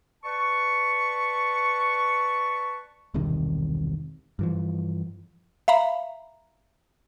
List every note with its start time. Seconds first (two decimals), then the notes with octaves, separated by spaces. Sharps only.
0.24 B4 D5 A5 C#6
3.14 E1 C2 C3 D#3
4.39 G2 E3 F3
5.68 E5 F5 A#5 B5